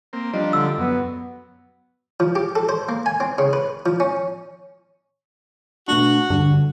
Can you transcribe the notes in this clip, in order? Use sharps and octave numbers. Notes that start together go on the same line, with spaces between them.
A#3 C4
F3 G3 D4 D#5 A#5
D3 E6
F#2 B3
F3
G4
A4
C5
A#3
G#5
C4
C#3
B4
F3
C#4
B2 A3 D4 F#4
G2 D3